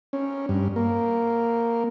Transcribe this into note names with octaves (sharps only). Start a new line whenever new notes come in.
C#4
G2
A#3